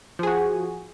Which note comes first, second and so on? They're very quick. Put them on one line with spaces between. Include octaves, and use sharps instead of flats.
F3 G#4 F#4